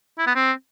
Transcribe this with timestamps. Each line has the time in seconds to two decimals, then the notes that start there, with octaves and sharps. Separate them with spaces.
0.18 E4
0.27 B3
0.35 C4